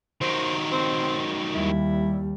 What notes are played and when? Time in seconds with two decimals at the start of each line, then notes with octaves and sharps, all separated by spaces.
0.21 D#3 F#3 C5
0.72 C4
1.54 D#2 G3 E4